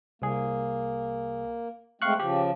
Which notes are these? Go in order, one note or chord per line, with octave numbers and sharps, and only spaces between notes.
C2 A#3 G#4
G#3 A3 C4 F5 C#6 F#6
C#3 F3 G4